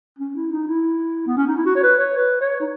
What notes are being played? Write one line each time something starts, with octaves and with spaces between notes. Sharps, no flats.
C#4
E4
D#4
E4
B3
C#4
D#4
E4
F#4
C#5
B4
C#5
B4
C#5
D#4